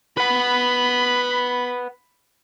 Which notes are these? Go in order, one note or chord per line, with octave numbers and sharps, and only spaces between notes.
B4 F#5 B5